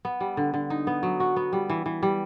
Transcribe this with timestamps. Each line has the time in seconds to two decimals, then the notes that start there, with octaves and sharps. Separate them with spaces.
0.05 B3
0.20 G3
0.37 D3
0.54 D3
0.70 D#4
0.87 B3
1.03 F#3
1.20 F#4
1.36 B3
1.53 G3
1.70 E3
1.86 E3
2.03 G3